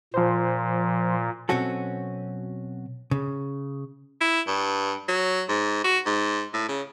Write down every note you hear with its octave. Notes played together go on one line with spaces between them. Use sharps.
A#2 F3 C5
B2 F#3 C4 C#4 F#4 A4
C#3
E4
G2
F#3
G#2
F#4
G#2
A2
C#3